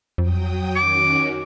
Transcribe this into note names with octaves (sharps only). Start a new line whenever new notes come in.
F2 F#3 G5 D#6
D#3 C#4 F#4 D6